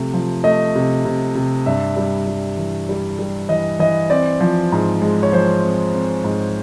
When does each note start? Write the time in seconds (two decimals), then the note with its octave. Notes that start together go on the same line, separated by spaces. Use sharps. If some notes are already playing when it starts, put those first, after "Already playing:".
Already playing: C3 F3 A3
0.14 F3
0.44 A3 D#5
0.75 C3
1.05 C3
1.35 C3
1.66 G2 E5
1.97 G3
2.27 G3
2.57 E3
2.89 G3
3.19 G3
3.49 E3 D#5
3.79 E3 D#5
4.10 C4 D5
4.41 F3
4.72 G#2
5.02 G#3
5.23 C#5
5.32 F3 C5
5.63 C4
5.94 C4
6.24 G#2